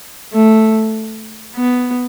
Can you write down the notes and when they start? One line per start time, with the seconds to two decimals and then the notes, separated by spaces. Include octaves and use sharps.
0.34 A3
1.56 B3